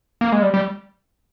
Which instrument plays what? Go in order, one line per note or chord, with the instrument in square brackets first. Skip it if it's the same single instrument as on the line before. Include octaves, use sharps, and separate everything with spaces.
[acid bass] A#3
G#3
G3
G3